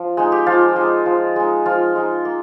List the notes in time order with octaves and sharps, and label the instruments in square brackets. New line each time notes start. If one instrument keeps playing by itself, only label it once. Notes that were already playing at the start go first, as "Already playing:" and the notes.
Already playing: [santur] F3
G#3 D#4
G4
F3 F4
G#3 D#4
F3
G#3 D#4
F3 F4
G#3 D#4
A#3